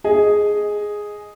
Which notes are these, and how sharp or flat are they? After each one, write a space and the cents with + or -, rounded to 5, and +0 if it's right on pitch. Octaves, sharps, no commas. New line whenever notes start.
G#4 +0 D#5 +0